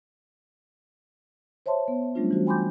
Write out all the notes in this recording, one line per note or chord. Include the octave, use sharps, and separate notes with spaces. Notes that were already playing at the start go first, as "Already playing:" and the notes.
C5 C#5 E5 A5 C6
B3
F#3 G3 A3 C#4 D4 F4
E3 G3 C#4 F#4 C5
G5 G#5 B5 C6 D6 G6